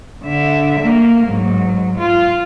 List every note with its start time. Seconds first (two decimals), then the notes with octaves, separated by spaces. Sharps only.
0.23 D3 E5
0.80 A#3
1.26 G#2 F#3
1.99 F4